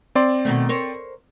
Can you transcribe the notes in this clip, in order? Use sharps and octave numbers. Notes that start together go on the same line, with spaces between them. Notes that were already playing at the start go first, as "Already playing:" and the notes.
C4 D5 C6
B2 D#3 A3
A#4 C5 C#5